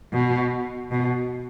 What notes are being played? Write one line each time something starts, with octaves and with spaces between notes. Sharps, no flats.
B2
B2